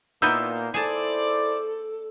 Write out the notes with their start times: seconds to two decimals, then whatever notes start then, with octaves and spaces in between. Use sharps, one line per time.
0.22 A#2 A#3 B3 D#4 E4 E6 G6
0.74 E4 G#4 A4 C5 D5 A5